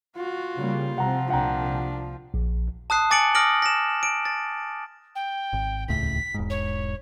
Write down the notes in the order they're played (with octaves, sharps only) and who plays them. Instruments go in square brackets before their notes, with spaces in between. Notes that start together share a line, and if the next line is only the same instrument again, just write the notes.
[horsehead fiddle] F4 [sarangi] F#4
[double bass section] C#3 G3 A#3
[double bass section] C3 C4 [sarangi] F3 [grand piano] F#5 A#5
[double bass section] C2 A#2 [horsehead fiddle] D4 [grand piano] F#5 G5 A#5
[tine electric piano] A#1
[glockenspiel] A5 D#6 F#6 C7
G#5 D6 A6 C#7 D7 F#7
D6 D#6 F6 A#6 D7 F#7
A#6 E7
D7
A6
[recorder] G5
[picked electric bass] G#1
[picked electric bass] D#1 C#2 A2 [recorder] B6
[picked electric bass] E1 G#2
[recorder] C#5